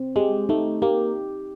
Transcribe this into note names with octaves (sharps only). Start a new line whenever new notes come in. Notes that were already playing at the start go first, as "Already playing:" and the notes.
Already playing: C4
G#3 G4
A3 D#4
A#3 G4